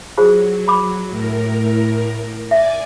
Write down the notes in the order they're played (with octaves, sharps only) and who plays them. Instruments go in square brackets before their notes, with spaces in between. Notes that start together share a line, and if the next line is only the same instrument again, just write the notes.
[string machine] F#3 [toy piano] F4 G#4 C5
[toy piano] B5 D6
[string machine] A2 A#4
[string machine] D5 G#5 D6 [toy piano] E5